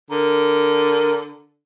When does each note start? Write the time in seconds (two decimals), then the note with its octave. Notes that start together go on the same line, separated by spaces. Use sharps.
0.10 D3 A#4